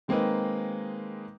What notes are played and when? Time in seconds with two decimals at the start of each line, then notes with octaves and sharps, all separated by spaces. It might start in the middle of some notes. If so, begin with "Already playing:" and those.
0.08 D#3 G#3 A#3 C4 D#4 B4